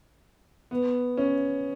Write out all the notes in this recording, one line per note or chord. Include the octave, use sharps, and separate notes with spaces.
B3
C#4